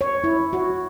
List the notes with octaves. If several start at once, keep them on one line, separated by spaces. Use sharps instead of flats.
C#5
E4
F#4